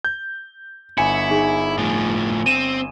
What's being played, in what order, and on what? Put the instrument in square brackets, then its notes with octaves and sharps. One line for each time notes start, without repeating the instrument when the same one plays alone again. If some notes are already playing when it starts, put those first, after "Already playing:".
[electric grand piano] G6
[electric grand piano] G1 G#5 C#7 [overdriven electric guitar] E4
[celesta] D#4 G#4
[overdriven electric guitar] A2 F3
[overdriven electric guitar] C4 [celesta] D#7 E7